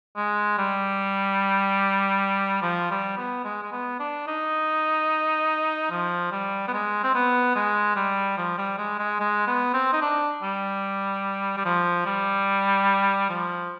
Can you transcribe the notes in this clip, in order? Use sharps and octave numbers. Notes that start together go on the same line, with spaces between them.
G#3
G3
F3
G3
B3
G#3
G#3
B3
D4
D#4
F3
G3
B3
G#3
C4
B3
G#3
G3
F3
G3
G#3
G#3
G#3
B3
C4
D#4
D4
G3
G3
F3
G3
F3